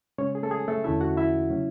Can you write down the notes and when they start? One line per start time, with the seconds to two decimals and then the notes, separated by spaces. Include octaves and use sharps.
0.18 C#3 G#3 C#4 C#5
0.35 G#4
0.43 A3 A4
0.51 G#4
0.68 A3 A4
0.84 E2 D3 A3 C#4 E4 E5
1.01 F#4 F#5
1.17 E4 E5
1.50 C#3 F#3 C#4